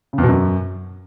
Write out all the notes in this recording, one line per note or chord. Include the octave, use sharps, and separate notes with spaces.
C#3
E2
B2
F#2